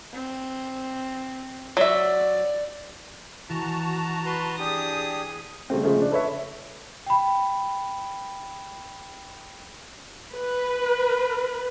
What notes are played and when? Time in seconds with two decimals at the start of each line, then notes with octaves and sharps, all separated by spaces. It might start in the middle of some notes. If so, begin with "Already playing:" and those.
0.14 C4
1.77 F#3 D5 E5
3.49 E3 F#4 A5 A#5
4.26 B4 C6
4.59 D4 G4 G#4 D#6
5.70 C#3 G3 A3 C4
5.83 C#3 F3 G#3 A3 C#4
5.97 C#3 D4
6.12 A4 B4 C#5 E5
7.06 G5 B5
10.35 B4